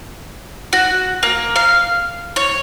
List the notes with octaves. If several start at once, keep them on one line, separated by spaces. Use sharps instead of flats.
F#4
A#3
F5
C#5